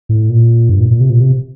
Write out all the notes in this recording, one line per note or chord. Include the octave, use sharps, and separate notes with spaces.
A2
A#2
G2
A#2
A#2
C3
A#2
C3